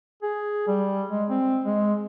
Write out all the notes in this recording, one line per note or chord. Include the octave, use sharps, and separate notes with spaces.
G#4
G3
G#3
C4
G#3